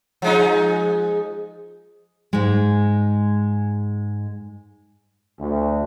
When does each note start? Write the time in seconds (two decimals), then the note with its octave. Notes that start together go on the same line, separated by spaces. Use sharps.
0.22 F3 G#3 D#4
2.33 G#2 G#3
5.39 D2